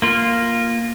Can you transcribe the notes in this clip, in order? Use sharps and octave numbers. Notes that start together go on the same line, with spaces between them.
A#3 F4